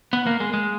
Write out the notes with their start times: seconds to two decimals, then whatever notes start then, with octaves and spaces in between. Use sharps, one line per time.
0.13 B3
0.27 A#3
0.40 G#3
0.54 G#3